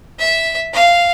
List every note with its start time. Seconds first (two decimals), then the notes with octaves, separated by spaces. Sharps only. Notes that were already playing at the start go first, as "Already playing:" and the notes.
0.19 E5
0.74 F5